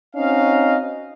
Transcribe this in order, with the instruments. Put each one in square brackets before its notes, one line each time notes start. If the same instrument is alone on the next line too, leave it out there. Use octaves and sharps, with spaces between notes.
[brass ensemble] C4 C#4 D#4 F#4 D#5 F5